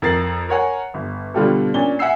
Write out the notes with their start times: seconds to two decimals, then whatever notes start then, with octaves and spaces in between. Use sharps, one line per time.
0.02 F2 A#4 A6 C7 F#7
0.49 A#4 C#5 F#5 G#5
0.94 G1
1.34 B2 D3 G3 F4 G4 A4
1.74 A#2 C#4 D4 G7
1.99 E5 F#5 G#5 E6 C7